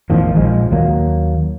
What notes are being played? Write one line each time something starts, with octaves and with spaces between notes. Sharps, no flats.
A1 E2 D#3 F3
A#1 F3 G#3
D#2 F#3 A#3